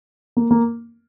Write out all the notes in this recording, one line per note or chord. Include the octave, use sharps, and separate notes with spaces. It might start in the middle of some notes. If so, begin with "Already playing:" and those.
A#3
A#3